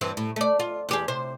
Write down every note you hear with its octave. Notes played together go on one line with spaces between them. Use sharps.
G2 E3 C4
A2
A3 D5
F4
E2 G4 G#4
C3 C5